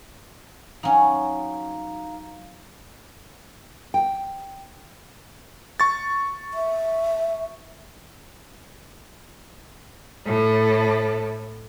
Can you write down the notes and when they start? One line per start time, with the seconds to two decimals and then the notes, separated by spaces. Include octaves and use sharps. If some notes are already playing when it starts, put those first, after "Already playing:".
0.83 F#3 C#4 D#4 F5 A#5
3.94 G5
5.80 C#6 A6
6.54 E5
10.24 A2 A4